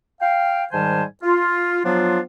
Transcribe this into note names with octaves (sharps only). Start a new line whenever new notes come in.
F5 G5
G#2 D#3 G3 C5 G#5 A5
F4
F3 F#3 B3 D4 F4